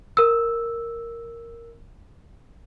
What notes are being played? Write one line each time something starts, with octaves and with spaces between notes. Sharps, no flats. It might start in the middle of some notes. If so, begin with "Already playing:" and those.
A#4 E6